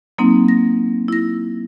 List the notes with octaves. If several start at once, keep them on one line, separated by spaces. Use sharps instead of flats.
F#3 A#3 C4 D#4
A#6
E4 A#6